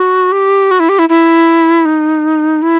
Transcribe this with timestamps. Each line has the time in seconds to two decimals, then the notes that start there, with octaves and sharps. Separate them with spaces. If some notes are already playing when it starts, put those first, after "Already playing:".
Already playing: F#4
0.32 G4
0.71 F#4
0.80 E4
0.89 G4
0.99 E4
1.09 E4
1.85 D#4
2.62 E4